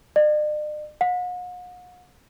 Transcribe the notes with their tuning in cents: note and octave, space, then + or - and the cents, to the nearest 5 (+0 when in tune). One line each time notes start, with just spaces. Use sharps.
D5 +45
F#5 -45